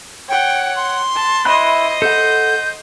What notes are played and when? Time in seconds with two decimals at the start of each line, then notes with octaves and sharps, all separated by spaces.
0.29 C#5 F#5 G5
0.76 C6
1.15 A5
1.45 E4 C5 D#5 B5 F#6
2.02 A4 F#5 G6